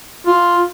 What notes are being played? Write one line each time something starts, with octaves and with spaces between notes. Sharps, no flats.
F4